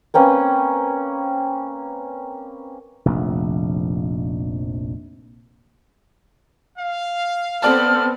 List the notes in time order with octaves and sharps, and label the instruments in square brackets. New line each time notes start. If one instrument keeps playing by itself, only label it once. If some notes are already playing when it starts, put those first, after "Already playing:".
[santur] A#3 C4 C#4 B4
[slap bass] F1 A#1
[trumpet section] F5
[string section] B3 C4 [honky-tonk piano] A4 D5 A5 [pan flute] F6